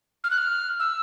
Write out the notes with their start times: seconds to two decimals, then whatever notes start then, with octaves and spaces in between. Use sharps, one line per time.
0.24 F6
0.31 F#6
0.38 F6
0.80 E6